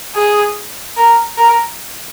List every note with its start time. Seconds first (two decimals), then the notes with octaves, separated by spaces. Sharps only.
0.15 G#4
0.97 A#4
1.38 A#4